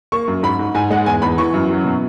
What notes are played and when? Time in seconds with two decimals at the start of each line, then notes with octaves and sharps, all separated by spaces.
0.12 A#3 C#6
0.28 F#2
0.43 G#2 B5
0.59 G#2
0.74 G#2 G#5
0.90 G#3 F#5
1.06 E2 G#5
1.22 E2 B5
1.38 E3 C#6
1.54 F#2
1.70 F#3
1.85 B2